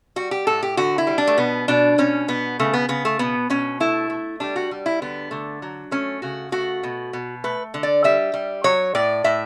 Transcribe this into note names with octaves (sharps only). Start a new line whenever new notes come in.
G3 F#4
G4
A2 A4
G4
D3 F#4
E4
G3
D4
A3
B2 B3
B2 D4
B2 C#4
B2 B3
C#3 A3
B3
C#3 B3
A3
B2 B3
B2 C#4
A3 E4
A3
G3 D4
F#4
G3
E4
D3 B3
D3 A3
F#3
A3 C#4
C#3 F#4
A3 F#4
B2
B2
A3 B4
D3
D5
G3 E5
G3
F#3 C#5
A2 D5
A2 E5